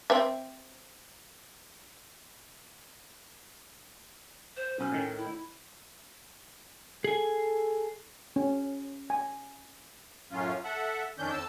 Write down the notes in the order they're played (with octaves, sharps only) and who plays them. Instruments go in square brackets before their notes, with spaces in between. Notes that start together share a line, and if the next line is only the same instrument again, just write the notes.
[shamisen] C4 C5 E5
[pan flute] C5
[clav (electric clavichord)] B1 [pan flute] C#4
[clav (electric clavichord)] A2 D#3
[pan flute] E4
[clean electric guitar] G#4 G#5 [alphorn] A4
[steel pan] C#4
G#5
[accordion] F#2 A2 F#3 C#4 F4
A4 E5 F#5
F2 D#3 C#4 D4 G6
F2 A5 E6